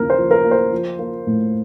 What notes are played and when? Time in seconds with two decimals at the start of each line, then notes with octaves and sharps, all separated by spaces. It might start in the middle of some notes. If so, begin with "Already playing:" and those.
Already playing: D#2 C#3 A#4
0.10 C5
0.17 F3
0.31 A#4
0.44 A#3
0.51 C5
0.72 F3
0.99 A#3
1.27 A2